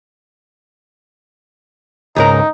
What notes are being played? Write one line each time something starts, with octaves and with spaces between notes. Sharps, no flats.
C#2 G#2 D#4 A#4